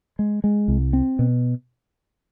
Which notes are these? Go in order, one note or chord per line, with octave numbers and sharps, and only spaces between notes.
G#3
G#3
C2
C4
B2